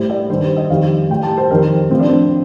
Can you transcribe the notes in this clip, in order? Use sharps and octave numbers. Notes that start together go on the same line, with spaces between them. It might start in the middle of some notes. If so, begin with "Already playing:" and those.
Already playing: A2 G3 C5
D5
G2 D#3 G3 C5
C5
D#5
F2 D#3 G3 F5
A2 G3 G5
A5
C5
F2 D#3 G3 A#4
A2 F3 C4
D4
C4